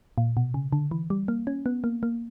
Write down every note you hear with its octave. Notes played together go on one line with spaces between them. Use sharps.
A#2
B2
C#3
D3
E3
G3
A#3
C#4
B3
A#3
A#3